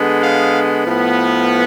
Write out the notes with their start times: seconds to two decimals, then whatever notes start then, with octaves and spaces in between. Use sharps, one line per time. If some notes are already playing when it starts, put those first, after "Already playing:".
Already playing: D3 G#3 B3
0.21 F5
0.86 A2 F3 B3